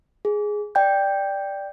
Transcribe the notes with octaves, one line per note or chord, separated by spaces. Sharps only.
G#4
D5 G5 G6